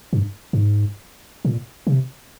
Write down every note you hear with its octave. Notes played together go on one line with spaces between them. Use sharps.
G#2
G2
G2
G#2
A#2
C3